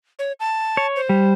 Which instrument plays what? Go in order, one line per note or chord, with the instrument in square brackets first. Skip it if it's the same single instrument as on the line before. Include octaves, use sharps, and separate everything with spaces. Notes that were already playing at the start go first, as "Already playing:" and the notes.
[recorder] C#5
A5
[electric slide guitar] C#5
[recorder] C5
[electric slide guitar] G3